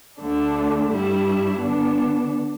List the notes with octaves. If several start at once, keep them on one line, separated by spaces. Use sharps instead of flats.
D2 D3 A3 D4
G2 G3 E4
D3 B3 D4